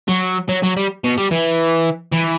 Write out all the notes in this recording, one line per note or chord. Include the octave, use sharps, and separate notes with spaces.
F#3
F#3
F#3
G3
B2
G3
E3
E3